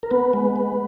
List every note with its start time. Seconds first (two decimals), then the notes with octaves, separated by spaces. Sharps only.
0.03 A#4
0.11 B3 B4
0.33 G#3
0.56 B3